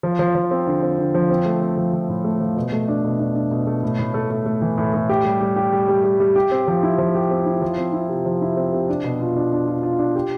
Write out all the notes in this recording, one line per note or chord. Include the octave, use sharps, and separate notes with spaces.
F3
F3
F3
C4
D3
C4
D3
F3
C4
A3
C4
F3
F3
A2
A3
F3
B2
A3
D4
B2
D4
D4
B2
A3
A2
A2
A3
A3
A3
E3
A2
A2
G4
G3
G3
G4
G3
G3
G3
G3
G4
C4
F3
E4
F3
G4
C4
E4
F3
C4
E4
C3
F3
E4
C4
C3
D4
B2
F4
D4
D4
F4
F4
D4
G4